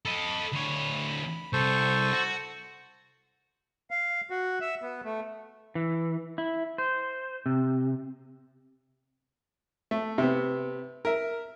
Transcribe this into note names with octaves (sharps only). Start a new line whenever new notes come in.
A4 D#5 B5
D2 C#5
C2 A4 C5 C#6
F#4
F5
F#4
E5
B3
A3
E3
E4
C5
C3
A3
C3 B3
A#4 E5